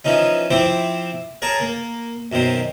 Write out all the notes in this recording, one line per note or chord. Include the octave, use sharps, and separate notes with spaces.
E3 F3 C#4 D#4
F3 C4 E4 C5 D6
G#4 A#4 C#5 A5 A#5
A#3
F#2 B2 D#3 C5